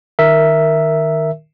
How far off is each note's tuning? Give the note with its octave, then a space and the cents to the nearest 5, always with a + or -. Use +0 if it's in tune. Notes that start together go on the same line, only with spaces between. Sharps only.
D#3 -15 A#4 +0 E5 +0